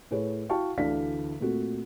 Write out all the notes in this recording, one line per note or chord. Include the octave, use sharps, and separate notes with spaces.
A2 G#4 B4 C#5
E4 F#4 F5 G5 A5 C#6
D2 D3 E3 D4 F5 B6
A#2 A3 C4 F#4